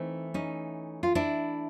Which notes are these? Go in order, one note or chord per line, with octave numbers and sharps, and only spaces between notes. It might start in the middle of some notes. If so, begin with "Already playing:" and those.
Already playing: E3 A3 C4 D#4
C#4 D#4
F4
D4 E4